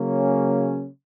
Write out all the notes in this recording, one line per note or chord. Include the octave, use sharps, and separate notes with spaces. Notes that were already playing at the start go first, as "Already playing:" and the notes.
Already playing: C#3 F#3 A#3 C#4